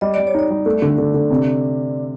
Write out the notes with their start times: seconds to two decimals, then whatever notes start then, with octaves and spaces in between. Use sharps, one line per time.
0.01 G3 D#5
0.14 G3 D5
0.27 C#5
0.34 D#4 D5
0.50 G3
0.66 A3
0.82 D3
0.98 D3
1.14 D3
1.30 C3